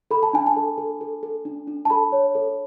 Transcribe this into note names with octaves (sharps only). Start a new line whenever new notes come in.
A4 B5
A5
D4 G#5
A5
A4
A4
A4
A4
D4
D4
A5
A4 B5
C#5
A4